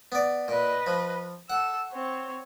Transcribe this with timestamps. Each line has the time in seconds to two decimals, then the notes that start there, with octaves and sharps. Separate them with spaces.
0.12 B3 D5
0.48 A#2 B4 D#5
0.86 F3
1.50 A4 F#5 E6
1.92 C4 C#5